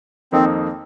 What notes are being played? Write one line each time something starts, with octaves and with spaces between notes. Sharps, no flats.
F2 D#3 A#3 C4 D#4